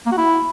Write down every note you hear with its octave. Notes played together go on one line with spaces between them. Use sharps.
A#3
F#4
E4